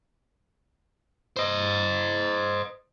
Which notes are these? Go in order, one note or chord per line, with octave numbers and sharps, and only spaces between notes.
C5 D#5